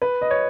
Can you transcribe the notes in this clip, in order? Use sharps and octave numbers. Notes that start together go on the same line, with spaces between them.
B4
D#5
C#5